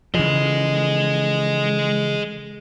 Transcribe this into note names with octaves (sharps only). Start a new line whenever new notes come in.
C#3 E3 F3 G#4 D#5